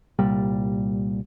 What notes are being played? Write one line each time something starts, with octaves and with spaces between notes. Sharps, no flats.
C2 A#2 G3